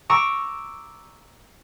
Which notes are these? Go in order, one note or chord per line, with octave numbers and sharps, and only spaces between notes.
A#5 C#6 D6 E6